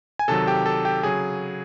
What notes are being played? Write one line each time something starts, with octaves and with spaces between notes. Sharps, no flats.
G#5
C3 D#3 F#3 A4 A5
G4 G5
A4 A5
G4 G5
C#3 F#3 G#4 G#5